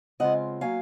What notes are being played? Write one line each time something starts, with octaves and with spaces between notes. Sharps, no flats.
C#3 G#3 C4 F4 D#5 F#5
F#3 A#3 F5 G#5